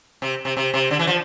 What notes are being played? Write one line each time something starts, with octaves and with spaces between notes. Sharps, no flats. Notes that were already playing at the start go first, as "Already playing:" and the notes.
C3
C3
C3
C3
D3
E3
F3